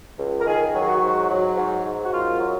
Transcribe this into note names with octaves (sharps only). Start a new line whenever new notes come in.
C#2
A#4
D#3 G#4
F#3
G#4
F#4
G#2
F#3
G#2
G#2
F#4
F#2 F4
F#3